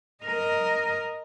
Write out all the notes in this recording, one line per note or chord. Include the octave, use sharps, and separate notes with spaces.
A#4 D#5